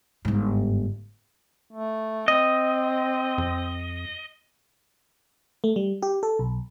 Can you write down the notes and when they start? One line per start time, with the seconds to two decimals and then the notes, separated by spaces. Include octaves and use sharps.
0.25 G1 G#2
1.73 A3
2.28 C4 D#5
3.38 F2
5.64 A3
5.76 G3
6.03 G4
6.23 A4
6.39 B1